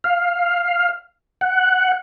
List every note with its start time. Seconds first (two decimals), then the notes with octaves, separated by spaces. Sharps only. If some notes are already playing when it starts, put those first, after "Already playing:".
0.04 F5
1.41 F#5